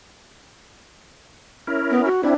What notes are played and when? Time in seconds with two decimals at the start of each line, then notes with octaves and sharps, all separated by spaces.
1.67 C#4 E4 A#4
1.91 B3
2.05 F#4
2.23 C4 D4 E4